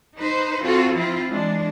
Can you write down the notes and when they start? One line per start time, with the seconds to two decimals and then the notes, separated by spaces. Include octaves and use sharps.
0.17 D#4 B4 C5
0.63 C4 F4 F#4 A4
0.94 F3 C4 E4 F4
1.31 E3 G#3 D4